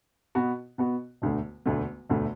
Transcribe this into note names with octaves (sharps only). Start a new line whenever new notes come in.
B2 B3 F#4
B2 B3 F#4
E1 D2 D3 A3
E1 D2 D3 A3
E1 D2 D3 A3